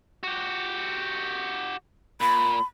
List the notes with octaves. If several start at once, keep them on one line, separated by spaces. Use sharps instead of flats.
F#4 G4
A#2 B5